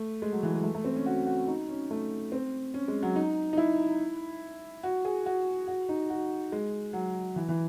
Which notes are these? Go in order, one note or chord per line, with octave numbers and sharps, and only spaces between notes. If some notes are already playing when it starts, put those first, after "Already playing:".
Already playing: A3
G#3
F#3
E3
G#3
A3
A3
C4
C#4
F#4
F#4
D#4
C#4
A3
C4
C#4
G#3
F#3
D#4
D#4
E4
F#4
G#4
F#4
F#4
D#4
F#4
G#3
F#3
E3
E3